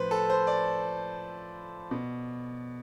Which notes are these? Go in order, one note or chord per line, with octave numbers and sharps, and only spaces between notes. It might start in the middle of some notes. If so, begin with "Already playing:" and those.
Already playing: A2 F3 B4 C5
A4
C5
D5
B2